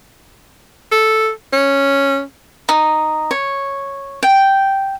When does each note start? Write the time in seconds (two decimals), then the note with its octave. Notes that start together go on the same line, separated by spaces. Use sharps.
0.92 A4
1.53 C#4
2.69 D#4
3.31 C#5
4.23 G5